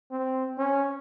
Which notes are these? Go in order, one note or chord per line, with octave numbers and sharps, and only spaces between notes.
C4
C#4